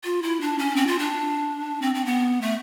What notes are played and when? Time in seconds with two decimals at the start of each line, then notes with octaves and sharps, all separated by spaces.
0.04 F4
0.22 E4
0.41 D4
0.58 C#4
0.76 C4
0.87 F4
0.99 D4
1.82 C4
1.95 C4
2.05 B3
2.42 A3